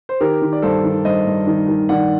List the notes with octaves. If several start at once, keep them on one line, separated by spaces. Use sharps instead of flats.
C5
D#3 G4 A#4
D#3
D5
G2 A4 C5
D#3
G2 C5 D#5
G2
D#3
D#3
D#3 D5 F#5